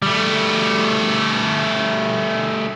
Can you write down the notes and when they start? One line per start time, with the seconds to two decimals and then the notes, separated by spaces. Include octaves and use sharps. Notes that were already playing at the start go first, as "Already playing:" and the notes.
0.02 G3 A3